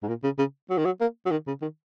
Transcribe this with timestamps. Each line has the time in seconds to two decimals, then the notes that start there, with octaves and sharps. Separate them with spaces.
0.03 G#2
0.08 A#2
0.24 C#3
0.39 C#3
0.70 F#3
0.78 D#3
0.85 F#3
1.01 A#3
1.26 F#3
1.31 D#3
1.47 C#3
1.62 D#3